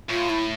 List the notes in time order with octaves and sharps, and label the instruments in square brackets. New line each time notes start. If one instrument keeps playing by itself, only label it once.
[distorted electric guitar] A2 [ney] F4
[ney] E4